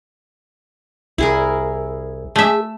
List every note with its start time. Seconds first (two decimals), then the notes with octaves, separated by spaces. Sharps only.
1.18 C2 E4 G#4 A#4
2.36 A3 G#4 E5